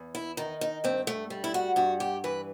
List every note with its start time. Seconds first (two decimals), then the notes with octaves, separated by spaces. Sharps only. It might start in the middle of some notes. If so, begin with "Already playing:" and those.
Already playing: E2
0.15 E4
0.37 D#3 D#4
0.61 D#4
0.84 G2 C4
1.07 A3
1.30 G3
1.44 E4
1.54 F#4
1.76 G2 F#4
2.00 G4
2.24 E3 B4